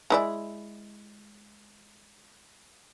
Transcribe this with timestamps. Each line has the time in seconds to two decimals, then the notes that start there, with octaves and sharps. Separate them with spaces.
0.10 G#3 E4 D5